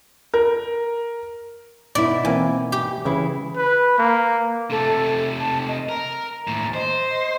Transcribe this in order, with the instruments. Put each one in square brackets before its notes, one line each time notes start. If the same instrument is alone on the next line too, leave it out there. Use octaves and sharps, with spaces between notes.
[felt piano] A#4
[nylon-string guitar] B2 D#4 E4 [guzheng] D5
[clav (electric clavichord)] E3 A#3 C4 [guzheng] G#5
[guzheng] G4
[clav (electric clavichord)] C#3 [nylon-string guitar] E3 E4 F5
[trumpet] B4
A#3
[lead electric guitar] C3 A3 [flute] A4
[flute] A5
D#5
[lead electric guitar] A#4 [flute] A#5
[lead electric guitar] D#2 A2
[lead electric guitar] C5 [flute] D#5